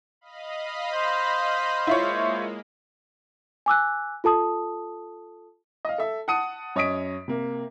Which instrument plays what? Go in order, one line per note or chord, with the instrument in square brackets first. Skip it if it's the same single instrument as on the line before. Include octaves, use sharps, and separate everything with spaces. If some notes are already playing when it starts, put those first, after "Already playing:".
[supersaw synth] D#5 F5 B5
[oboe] C5
[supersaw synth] G#3 A#3 [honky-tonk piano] E4 F4 C#5
[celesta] G#5 D6 E6 F#6
F4 A4 A5 D#6
[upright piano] D#5 F5
A4 E5
F#5 A5 D#6 C#7 D#7
F#2 C#5 D#5 D#6 B6 D7
C3 A#3